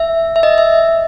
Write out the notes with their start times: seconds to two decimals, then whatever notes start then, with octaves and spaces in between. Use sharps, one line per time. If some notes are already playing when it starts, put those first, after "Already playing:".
Already playing: E5
0.36 E5
0.43 D#5
0.58 E5